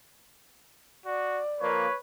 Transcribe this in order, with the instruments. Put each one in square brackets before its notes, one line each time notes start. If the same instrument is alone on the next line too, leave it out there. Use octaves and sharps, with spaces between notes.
[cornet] F#4 [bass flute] D5
[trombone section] F3 A#3 [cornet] B4 [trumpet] C#5